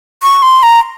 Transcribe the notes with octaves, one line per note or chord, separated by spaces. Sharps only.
C#6
C6
A#5